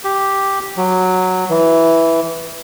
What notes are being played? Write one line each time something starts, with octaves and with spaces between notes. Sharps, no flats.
G4
F#3
E3